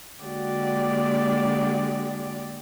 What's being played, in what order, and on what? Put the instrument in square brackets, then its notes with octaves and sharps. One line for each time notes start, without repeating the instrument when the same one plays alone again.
[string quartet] D3 G#3 A#3 F#4 G4 D5